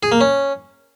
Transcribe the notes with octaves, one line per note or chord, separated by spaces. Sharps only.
G#4
A#3
C#4